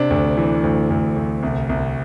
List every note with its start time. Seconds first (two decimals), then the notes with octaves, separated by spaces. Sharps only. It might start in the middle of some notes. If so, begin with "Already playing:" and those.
Already playing: C3 D4
0.10 D2
0.37 E3
0.64 D2
0.90 D2
1.16 D2
1.43 C2
1.69 C2